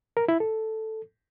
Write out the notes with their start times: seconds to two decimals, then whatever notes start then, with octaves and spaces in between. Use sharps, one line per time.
0.17 A#4
0.28 E4
0.40 A4